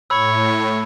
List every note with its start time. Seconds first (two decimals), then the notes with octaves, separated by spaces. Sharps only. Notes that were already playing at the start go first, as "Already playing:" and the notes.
0.10 A2 C#5 B5 E6